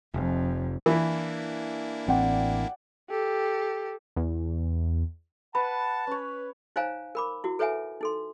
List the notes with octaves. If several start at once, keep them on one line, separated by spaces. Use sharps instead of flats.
F1 F2
E3 A#3 D4 E4
A1 C4 D5 F#5 G5
G4 A4
E2
B4 F#5 A5 B5
C#4 B4 C#5
D#4 C5 C#5 F5 G#5 A#5
A#4 B5 D6
E4 F#4
A4 B4 C#5 E5 F#5 G#5
D#4 A4 C6